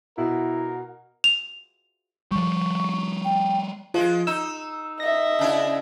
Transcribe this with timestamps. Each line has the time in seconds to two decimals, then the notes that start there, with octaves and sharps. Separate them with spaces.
0.18 B2 E4 A#4 F#5
1.24 F7
2.32 F3 G3 C#6
3.25 G5
3.94 F3 G#3 F4
4.27 D#4 E6
5.00 D#5 E5 A#6
5.39 C#3 D4 E4